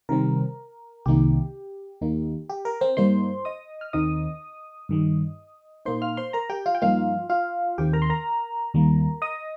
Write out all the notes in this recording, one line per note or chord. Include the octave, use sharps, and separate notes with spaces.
C3 D#3 G3 C4 A#4
C2 C3 D#3 A#3 D#4 G4
D#2 D#3 A#3 D#4
G4
A#4
C4 C5
G2 G3 A#3 D#4 C5 C6
D#5 D#6
F6
D#2 D#3 C4 D#4 D#5 D#6
G2 D#3 G3
A#2 A#3 D#4 C5 C6
F5 F6
C5 C6
A#4 A#5
G4 G5
F4 F5
G5
G2 F3 A#3 D#4 F4 F5
F4 F5
D#2 D#3 C4 G4 G5
A#4 A#5
C6
A#4 A#5
D#2 D#3 G3 A#3
D#5 D#6